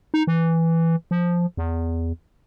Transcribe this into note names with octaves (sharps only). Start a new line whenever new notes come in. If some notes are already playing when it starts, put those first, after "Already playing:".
D#4
E3
F3
E2